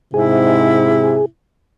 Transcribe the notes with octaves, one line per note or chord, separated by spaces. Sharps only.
G#2 C3 E4 G#4